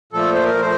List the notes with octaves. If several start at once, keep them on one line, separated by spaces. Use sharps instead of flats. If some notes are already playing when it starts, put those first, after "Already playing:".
A#2 F3 A3 A4
C5
A#4
F3 A3 C5